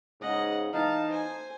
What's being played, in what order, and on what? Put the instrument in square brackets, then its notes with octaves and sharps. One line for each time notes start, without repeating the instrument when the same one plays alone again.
[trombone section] G#2 C#3 [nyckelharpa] D#5 F#5
[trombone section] E3 D#4 [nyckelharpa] F5 A5
[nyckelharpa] C5 G#5